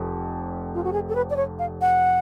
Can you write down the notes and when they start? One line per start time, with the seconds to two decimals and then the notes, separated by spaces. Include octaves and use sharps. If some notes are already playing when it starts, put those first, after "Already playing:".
Already playing: F1 F2
0.74 F4
0.84 F#4
0.93 G#4
1.09 A4
1.15 B4
1.30 D5
1.36 C#5
1.59 F5
1.81 F#5